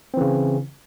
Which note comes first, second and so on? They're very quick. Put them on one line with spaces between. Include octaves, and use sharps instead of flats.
C4 E3 C#3